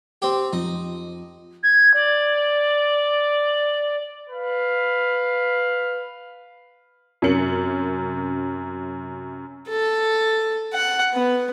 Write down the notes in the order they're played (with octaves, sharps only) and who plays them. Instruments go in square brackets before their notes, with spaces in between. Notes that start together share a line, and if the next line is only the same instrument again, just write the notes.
[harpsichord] C4 G4
[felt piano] F2 [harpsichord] D#4
[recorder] G#6
D5
[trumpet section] B4 F5
[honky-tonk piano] F#2 C3 C#4 A#4 C#7 F#7
[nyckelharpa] A4
F#5
B3